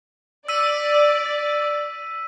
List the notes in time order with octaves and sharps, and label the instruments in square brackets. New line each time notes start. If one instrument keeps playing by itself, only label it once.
[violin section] D5 [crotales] E6 B6 D#7